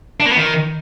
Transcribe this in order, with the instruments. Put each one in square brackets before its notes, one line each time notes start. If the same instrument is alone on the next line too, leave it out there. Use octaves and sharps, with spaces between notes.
[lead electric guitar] D4
A#3
B3
D#3